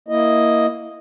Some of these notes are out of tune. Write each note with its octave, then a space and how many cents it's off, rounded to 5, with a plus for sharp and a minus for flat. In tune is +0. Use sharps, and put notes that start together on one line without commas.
A#3 +0 E4 +0 D#5 +0